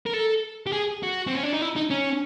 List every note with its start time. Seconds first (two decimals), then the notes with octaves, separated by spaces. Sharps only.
0.07 A#4
0.14 A4
0.67 G4
0.73 G#4
1.03 F#4
1.27 C4
1.35 C#4
1.43 D4
1.53 D#4
1.62 E4
1.76 D#4
1.91 C#4